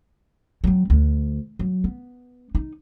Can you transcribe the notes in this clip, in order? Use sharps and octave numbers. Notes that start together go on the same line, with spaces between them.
F#3 C4
D2
F#3
B3
D#4